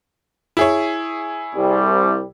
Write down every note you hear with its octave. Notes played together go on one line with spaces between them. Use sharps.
E4 G#4 C#5
C2 G3